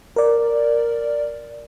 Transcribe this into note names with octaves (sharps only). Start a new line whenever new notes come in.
A#4 D5